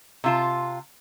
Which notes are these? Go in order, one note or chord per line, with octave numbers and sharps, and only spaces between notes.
C3 F4 A5